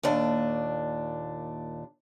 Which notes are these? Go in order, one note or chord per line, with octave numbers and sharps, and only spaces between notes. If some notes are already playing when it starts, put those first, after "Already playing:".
D#2 A#2 D4